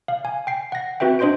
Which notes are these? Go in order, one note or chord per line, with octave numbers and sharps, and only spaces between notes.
F5
G#5
G5 C7
F#5 A#6
C4 F#4 B4 E5 G5
D4 C5 D#5 C6 G6 D7